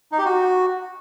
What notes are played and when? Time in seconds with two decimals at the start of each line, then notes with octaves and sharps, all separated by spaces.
0.12 D#4
0.19 G4
0.25 F#4